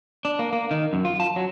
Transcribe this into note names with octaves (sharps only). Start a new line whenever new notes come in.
D4
A#3
A#3
D#3
F#2
F4
A5
F#3